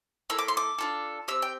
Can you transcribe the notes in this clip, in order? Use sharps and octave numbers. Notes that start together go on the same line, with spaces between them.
A#3 E4 A4 E6
D6
C6
D6
D4 F4 A4
C4 G4 E6
G5